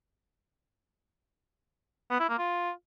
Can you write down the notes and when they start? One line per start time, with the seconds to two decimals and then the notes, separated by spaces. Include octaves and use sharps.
2.10 B3
2.20 E4
2.29 A#3
2.38 F4